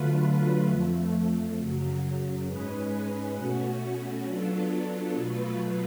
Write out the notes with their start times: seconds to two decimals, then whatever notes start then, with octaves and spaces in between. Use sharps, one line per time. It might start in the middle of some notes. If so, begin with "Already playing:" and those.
Already playing: D3 F#3 A3 F4 B4
0.67 F2 F3 A3
1.57 F#2 C#3 F#3
2.46 G#2 G#3 C#4 G#4 B4
3.35 B2 A3 C#4 F#4
4.25 F#3 B3 D4 F4 A4
5.14 B2 F#3 A3 F4 B4